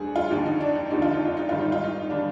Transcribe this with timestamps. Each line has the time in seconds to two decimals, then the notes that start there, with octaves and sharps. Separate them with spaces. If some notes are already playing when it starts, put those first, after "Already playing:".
Already playing: D2 D3 G3 G#4
0.16 F4
0.31 D#2 D3 F3 D#4
0.46 D#4
0.61 D4
0.75 D#4
0.90 D#2 D3 F3 D#4
1.02 F4
1.14 D#4
1.25 F4
1.37 D#4
1.49 G#2 D#3 G3 F4
1.60 D#4
1.72 F4
1.84 D#4
2.10 D#3 G3 D4